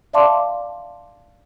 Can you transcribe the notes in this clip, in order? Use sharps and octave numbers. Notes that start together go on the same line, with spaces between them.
D5 E5 F5 A5 C6 D6